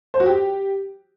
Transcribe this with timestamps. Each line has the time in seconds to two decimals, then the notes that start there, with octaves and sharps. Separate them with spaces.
0.14 C5
0.20 F#4
0.26 G4